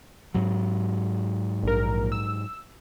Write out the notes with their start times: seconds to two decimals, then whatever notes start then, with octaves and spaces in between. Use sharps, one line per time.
0.34 G#2 F#3
1.63 A#1 A#4
2.12 E6